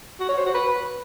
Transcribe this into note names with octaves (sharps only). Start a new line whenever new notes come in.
F#4
C#5
C5
F#4
B4